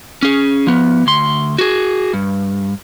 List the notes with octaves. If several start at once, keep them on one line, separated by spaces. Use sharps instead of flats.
C#4 G#4
F3 B3
D2 C6
F#4 G#4
G2